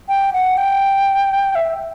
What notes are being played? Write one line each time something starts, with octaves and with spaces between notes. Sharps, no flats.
G5
F#5
G5
E5